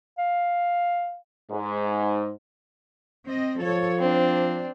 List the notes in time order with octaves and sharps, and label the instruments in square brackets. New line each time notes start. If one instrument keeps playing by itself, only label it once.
[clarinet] F5
[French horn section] G#2
[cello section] C4 D#5
[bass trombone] F3 [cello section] A4 C#5
[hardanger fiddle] C4 [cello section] D4